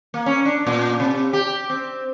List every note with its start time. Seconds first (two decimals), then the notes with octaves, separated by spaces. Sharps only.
0.14 A#3
0.26 C#4
0.45 D4
0.67 A#2
1.00 C3
1.33 G4
1.70 C4